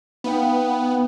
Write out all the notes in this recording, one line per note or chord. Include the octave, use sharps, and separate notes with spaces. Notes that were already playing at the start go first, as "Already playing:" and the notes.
B3 D#4 F5 G5